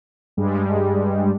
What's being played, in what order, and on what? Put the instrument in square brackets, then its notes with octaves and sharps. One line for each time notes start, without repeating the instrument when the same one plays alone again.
[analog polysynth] G2 G3 G#3